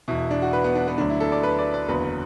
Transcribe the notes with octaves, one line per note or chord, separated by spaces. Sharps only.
E1 E2 B2 E4
D4
F#4
B4
B3
D4
B3
D2 D3 F#3 D4
E4
A4
D5
B4
D5
D5
F#1 E2 D3 F#3 B4